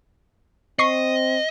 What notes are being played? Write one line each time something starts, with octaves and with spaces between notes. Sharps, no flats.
C4 D#5 C#6 C7